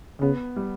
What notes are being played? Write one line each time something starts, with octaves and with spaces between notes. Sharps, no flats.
C#3 B3
G3